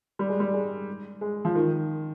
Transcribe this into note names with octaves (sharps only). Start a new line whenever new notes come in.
G3
G#3
G3
G#3
G#3
F3
D#3